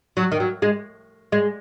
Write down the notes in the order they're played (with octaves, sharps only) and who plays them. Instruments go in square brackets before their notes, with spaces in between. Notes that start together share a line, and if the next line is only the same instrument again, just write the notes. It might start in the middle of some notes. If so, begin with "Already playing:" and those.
[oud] F#3
D#3
F#3
G#3
G#3